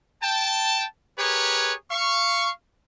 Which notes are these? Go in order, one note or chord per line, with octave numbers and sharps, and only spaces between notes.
G5 A5
G4 G#4 A#4 B4 C#5
F5 C#6